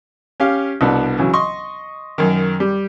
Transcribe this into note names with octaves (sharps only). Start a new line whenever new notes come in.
C#4 G4 F5
C2 B2 B3 D4
C#3 E3 F#3
D#5 C6 C#6
F#2 D#3
G3